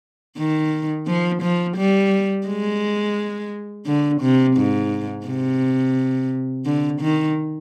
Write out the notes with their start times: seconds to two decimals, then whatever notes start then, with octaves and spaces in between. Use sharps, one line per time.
0.38 D#3
1.07 F3
1.42 F3
1.76 G3
2.47 G#3
3.86 D3
4.21 C3
4.56 G#2
5.26 C3
6.65 D3
7.01 D#3